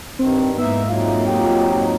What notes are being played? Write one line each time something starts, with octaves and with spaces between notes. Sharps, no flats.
G2 D#3 C4
G#2 A#3 B3 D#4 E4 E5
F2 F#3 D#4 F4
G4